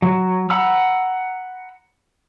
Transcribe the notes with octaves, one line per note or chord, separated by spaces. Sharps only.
F#3
F#5 A#5 B5 E6